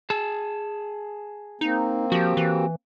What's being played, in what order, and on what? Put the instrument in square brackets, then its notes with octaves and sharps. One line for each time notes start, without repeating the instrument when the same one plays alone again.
[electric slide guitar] G#4 A5
[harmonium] A#3 C4 [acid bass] D#4
[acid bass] F3 [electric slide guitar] F#4 G4
[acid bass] E3